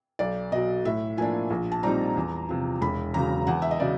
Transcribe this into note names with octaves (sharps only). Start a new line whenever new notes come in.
B1 D5
B2 F#3 D#5
A2 E5
F3 A#3 D4 G#5
A#1
A5
A#2 G3 C4 D#4 A#5
E2
C3 F3
E1 B5
E2 C#3 F#3 A#5
E2 F#5
E5
D#5
C#3 F#3 D5